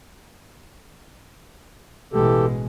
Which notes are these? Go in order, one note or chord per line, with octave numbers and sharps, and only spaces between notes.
A1 B2 E3 G#3 G4 A4